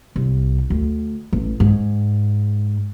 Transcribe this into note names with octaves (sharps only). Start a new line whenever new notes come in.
C2
D2
A1
G#2